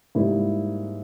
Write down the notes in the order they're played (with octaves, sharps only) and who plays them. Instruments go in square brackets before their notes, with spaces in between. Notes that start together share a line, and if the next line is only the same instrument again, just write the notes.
[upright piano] G#2 G3 A#3 E4